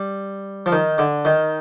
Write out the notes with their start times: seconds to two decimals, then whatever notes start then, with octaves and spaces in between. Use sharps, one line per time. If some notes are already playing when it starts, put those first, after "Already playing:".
Already playing: G3
0.66 F3
0.72 D#3
0.98 D3
1.25 D#3